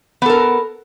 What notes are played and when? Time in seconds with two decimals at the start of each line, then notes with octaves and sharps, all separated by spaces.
0.22 B3
0.26 A4
0.30 A#4